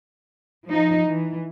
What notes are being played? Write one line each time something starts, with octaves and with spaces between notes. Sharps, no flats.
F3 D#4
E3